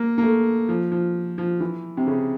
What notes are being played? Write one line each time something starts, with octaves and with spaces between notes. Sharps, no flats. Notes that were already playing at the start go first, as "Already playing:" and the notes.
Already playing: A#3
A#3
A3
F3
F3
F3
E3
C3
C#3